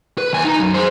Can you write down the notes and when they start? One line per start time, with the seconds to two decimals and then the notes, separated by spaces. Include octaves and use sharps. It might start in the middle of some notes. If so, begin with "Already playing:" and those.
0.18 B4
0.33 D#2 G#5
0.44 D#4 A#5
0.60 F#2
0.74 G#4 C5